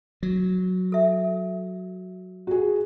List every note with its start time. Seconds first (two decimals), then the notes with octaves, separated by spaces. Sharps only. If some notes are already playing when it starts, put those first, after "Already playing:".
0.23 F#3
0.92 A4 E5
2.47 F#4 G#4